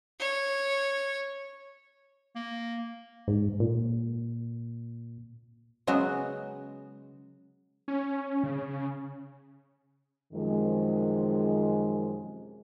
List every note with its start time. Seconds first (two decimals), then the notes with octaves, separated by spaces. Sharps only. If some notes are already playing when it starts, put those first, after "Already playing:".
0.20 C#5
2.35 A#3
3.28 G#2
3.60 A#2
5.87 C#3 F#3 G#3 B3 F#4
7.88 C#4
8.44 C#3
10.33 F#2 C3 D#3 F3 G#3